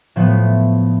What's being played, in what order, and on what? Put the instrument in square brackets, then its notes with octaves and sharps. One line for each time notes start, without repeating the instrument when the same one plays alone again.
[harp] A2 F3 A3 B3